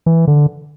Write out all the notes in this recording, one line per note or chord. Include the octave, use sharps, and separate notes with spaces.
E3
D3